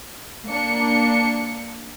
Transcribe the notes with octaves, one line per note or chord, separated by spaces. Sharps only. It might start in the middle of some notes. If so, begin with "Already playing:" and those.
A#3 D4 C#7